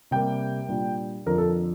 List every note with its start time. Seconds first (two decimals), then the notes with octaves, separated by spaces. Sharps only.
0.11 C3 G3 A#3 G5
0.69 A#2 G3 D4
1.26 F2 D3 F3 A#4
1.38 A4